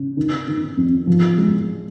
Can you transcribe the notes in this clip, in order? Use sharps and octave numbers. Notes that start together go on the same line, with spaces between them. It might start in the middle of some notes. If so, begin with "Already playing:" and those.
Already playing: C#3
D#3
D#3
F2
F3
G#3